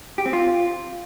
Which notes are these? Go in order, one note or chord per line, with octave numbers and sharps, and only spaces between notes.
G4
C4
F4